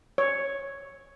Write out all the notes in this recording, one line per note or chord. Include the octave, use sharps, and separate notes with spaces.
C#5